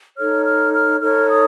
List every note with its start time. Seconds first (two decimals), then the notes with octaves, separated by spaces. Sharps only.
0.18 D#4 A4 C#5 F6
0.46 F6
0.73 F6
1.00 D#4 A4 C#5 F6
1.28 D#6